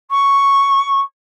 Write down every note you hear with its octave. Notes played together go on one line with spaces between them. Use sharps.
C#6